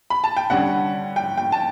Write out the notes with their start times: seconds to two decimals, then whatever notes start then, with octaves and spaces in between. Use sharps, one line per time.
0.10 B5
0.24 A5
0.37 G5
0.50 D3 G3 C#4 F#5
1.16 G5
1.38 G5
1.52 A5